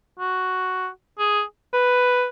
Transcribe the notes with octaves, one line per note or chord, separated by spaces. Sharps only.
F#4
G#4
B4